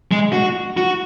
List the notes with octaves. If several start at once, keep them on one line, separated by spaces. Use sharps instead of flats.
G#3
F#4
F#4